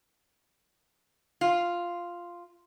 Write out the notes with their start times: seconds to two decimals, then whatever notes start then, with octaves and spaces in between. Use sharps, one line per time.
1.41 F4